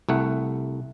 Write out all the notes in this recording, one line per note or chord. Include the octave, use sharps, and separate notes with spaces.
C2 A3 F#5